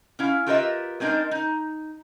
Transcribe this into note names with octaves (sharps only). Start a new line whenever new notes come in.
C#4 E4 F5
F4 G4 A#4 B4 D#5 E5
G#3 C4 D4 D#4 A#4
D#4